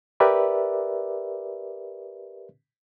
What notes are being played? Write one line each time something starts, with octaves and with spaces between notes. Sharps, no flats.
G4 A#4 B4 D5 E5